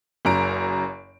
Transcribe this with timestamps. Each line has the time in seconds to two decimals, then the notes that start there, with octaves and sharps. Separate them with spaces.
0.25 F#1 F#2 A#5 D7